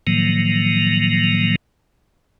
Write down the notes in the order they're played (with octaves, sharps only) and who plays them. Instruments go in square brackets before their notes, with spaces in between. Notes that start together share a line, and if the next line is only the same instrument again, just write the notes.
[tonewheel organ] A2 D#3 F3 F#3 A#3